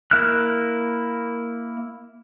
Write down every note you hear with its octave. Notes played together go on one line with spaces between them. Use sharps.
A#3 E4 F6 F#6